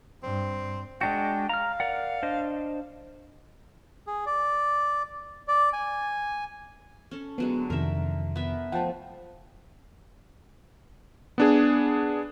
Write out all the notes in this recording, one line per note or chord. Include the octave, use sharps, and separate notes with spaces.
G2 C4
G#3 D4 F#4 G5
F5 A#5 F6
A#4 D5 F#5
D4 C5 D#5
G#4
D5
D5
G#5
C#4 A4
D3 F#3 G#3 B3
F2 C3 D#3 A#4 E5
B3 A#4 E5
F3 A3 F#5 G5 A5
B3 D4 G#4